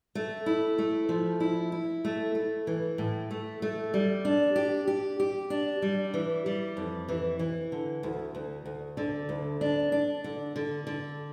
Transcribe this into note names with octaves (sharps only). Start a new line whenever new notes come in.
A3
E4
A3
F3
E4
E4
A3
A3
E3
A2
A3
A3
G3
D4
G4
G4
G4
D4
G3
E3
G3
F2
E3
E3
D3
D2
D2
D2
D3
D2
D4
D4
D3
D3
D3